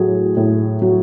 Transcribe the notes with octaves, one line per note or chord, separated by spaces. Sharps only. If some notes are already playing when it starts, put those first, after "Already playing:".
Already playing: A2 F#3 G#4
A2
F#3